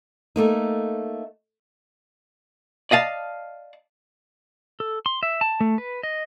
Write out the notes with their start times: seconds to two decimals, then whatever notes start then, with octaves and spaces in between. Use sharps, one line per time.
0.36 A3 A#3 D#4
2.91 D5 D#5 F5 A5
4.80 A4
5.06 C6
5.23 E5
5.41 A5
5.61 A3
5.78 B4
6.03 D#5